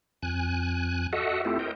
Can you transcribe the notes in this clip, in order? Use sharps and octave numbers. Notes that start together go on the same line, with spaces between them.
F2 G#5 F#6
F#4 A4 D#5 E5 F#5
A3 C4 E4 F4 G4 A4
A#4 C5 D#5 G5